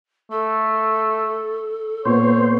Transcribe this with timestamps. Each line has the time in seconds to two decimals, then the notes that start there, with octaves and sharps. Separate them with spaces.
0.31 A3 A4
2.05 A#2 B3 C5 C#5